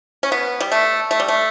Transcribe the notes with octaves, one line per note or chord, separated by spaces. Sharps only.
C#4
B3
G3
A3
A3
G3
A3